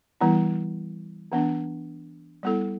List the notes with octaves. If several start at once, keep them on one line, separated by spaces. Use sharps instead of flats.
E3 G3 B3 E4
E3 B3 D4
G3 B3 E4 A4